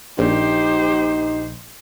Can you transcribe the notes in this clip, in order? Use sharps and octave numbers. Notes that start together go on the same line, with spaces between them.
A#1 D#4 G4 C5